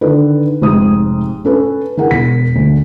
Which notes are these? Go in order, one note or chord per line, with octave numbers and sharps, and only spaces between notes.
D3 D#3 A4 B4
F1 G#2 C3 D#6
C#4 A4 B4
E3 G#4 A#4 F#5
E1 B6
D2